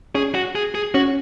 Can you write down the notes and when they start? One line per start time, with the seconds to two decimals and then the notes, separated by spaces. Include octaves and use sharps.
0.15 C#4 G#4
0.35 F#4
0.55 G#4
0.75 G#4
0.94 C#4 F#4